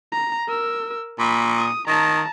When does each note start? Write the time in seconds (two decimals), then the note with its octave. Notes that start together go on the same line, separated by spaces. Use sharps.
0.12 A#5
0.48 A#4 E6
1.19 A#2 B5
1.57 D#6
1.87 D#3 A5 A#5